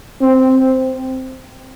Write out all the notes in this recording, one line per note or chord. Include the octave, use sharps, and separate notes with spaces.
C4